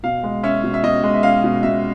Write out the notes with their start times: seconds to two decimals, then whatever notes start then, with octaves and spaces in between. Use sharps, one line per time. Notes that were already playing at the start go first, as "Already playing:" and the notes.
0.03 B2 F5
0.23 G#3
0.43 C#4 E5
0.64 B2
0.74 E5
0.83 B2 D#5
1.04 G#3
1.14 E5
1.23 C#4 F5
1.44 B2
1.63 B2 E5